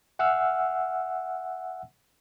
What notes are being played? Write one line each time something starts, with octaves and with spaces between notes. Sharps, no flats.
E5 F#5 G#5 E6 F6